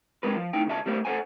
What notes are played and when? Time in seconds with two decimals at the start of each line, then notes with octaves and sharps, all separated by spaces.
0.23 C2 C3 G#3 A#4 B4
0.36 F3
0.53 A2 D#4 G5
0.66 C#2 C#3 E5 A5
0.86 G3 A3 A#3 C5
1.05 A4 A#4 C5 F#5 G#5